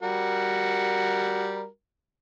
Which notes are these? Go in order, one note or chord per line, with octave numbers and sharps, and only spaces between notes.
G3 F#4 A#4